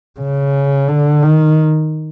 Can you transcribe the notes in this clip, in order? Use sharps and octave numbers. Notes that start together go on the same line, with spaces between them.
C#3
D3
D#3